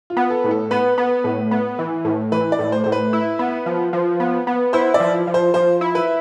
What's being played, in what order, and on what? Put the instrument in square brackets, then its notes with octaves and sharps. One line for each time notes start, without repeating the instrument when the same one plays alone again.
[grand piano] F4
[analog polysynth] B3
[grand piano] A4
[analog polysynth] A2
[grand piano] A4
[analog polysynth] B3 [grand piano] B4
[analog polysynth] B3
A2
B3
E3
A2
[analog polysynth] E3 [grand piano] B4
[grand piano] D5
[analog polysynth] A2
[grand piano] C5
[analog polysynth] A2 [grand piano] C5
[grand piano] B4
[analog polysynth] E4
B3
F3
F3
B3
B3
[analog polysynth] E4 [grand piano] C5
[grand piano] D5
[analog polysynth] F3
F3
[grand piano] C5
[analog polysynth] F3 [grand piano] C5
[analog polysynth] E4
[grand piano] B4